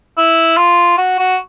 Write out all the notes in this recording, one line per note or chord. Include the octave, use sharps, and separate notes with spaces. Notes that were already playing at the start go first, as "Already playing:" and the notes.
E4
F4
F#4
F#4